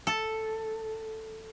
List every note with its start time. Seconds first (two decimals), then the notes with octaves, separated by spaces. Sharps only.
0.07 A4